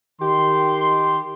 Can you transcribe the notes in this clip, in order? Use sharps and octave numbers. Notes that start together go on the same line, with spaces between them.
D#3 G4 C6